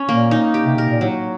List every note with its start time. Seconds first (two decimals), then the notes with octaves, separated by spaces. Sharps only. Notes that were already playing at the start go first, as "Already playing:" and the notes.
Already playing: C#4
0.09 A#2 A#3
0.31 D#4
0.54 G4
0.66 C3
0.77 B2 A#4
0.89 A#2
1.01 A2 F#3